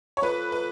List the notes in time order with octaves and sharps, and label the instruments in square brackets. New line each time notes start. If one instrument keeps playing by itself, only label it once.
[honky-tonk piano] C#5
[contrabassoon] F2 [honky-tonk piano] B4
[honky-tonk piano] B4